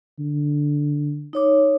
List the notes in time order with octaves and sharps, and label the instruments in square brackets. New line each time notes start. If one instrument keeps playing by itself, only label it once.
[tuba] D3
[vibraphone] D#4 C#5 D6